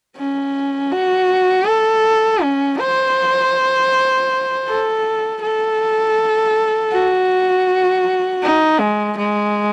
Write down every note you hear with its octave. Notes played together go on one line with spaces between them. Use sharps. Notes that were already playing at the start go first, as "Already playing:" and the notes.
C#4
F#4
A4
C#4
C5
A4
A4
F#4
D#4
G#3
G#3